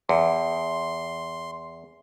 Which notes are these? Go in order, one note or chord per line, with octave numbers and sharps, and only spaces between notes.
E2 C6